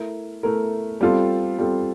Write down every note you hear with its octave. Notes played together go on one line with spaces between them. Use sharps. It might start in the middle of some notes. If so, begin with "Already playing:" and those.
Already playing: A3 E4 A#4
A3 E4 A#4
G3 C4 F4 A4
G3 C4 F4 A4